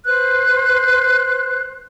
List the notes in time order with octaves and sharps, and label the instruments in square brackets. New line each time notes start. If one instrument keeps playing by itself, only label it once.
[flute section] B4 C5 F#6